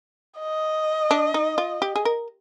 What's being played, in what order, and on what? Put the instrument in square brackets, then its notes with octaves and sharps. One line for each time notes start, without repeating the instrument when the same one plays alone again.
[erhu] D#5
[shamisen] D4
D#4
F4
G4
G#4
A#4